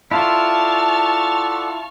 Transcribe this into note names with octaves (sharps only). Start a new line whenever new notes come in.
E4 F4 A4 D5 F#5 A5 C#6 F6